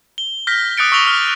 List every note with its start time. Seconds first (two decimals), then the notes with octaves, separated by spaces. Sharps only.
0.18 G7
0.47 F6 G6 A#6 B6
0.77 D6 D#6 F#6 A6 C#7 D7
0.92 C#6 E6 A#6 F7 G7
1.07 F6